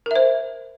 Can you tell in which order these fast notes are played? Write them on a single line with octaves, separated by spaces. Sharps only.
A#4 E5 C5